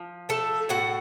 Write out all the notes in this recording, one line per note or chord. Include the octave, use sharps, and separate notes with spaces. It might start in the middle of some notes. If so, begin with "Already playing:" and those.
Already playing: F3
A3 A4 A5
A2 F#4 F#5